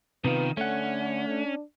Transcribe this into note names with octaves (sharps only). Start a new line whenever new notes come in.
C3 D#3 B3 F4 B4
D3 A3 C#4 F#5
D4